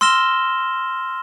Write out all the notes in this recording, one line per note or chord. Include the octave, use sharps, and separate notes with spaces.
C6 E6 F6 A#6 E7 G7